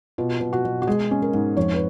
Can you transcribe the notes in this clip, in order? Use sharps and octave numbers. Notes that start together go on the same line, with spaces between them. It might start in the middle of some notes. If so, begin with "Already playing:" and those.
B2 F4
B2
F#4
B2
F#4
G#3 G#4
C#4
A#4
G#2
F2 C#5
B4